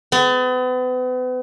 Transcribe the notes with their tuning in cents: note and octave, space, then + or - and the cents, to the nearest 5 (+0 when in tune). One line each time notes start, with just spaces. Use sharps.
B3 +40